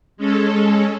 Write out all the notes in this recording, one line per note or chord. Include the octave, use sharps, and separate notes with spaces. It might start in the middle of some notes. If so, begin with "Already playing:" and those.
G#3 C#4 A4